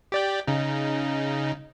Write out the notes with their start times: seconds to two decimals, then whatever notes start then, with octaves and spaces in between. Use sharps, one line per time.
0.12 G4 D5 G5
0.47 C#3 D#4